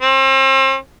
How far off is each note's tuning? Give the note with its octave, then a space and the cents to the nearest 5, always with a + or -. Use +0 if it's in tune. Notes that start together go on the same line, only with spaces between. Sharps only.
C4 +40